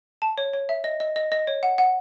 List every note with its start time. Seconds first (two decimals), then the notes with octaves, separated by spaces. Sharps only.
0.22 A5
0.38 C#5
0.53 C#5
0.69 E5
0.84 D#5
1.00 D#5
1.16 D#5
1.32 D#5
1.47 C#5
1.63 F#5
1.78 F#5